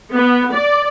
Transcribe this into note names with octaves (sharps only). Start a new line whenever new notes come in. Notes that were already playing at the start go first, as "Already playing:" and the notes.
B3
D5